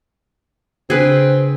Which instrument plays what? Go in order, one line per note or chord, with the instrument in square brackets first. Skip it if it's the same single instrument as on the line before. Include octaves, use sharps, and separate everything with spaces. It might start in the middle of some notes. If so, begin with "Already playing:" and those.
[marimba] C#3 D4 [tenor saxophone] C4 [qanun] G#4 B4